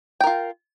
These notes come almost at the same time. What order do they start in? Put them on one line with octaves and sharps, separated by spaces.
G5 A#4 F4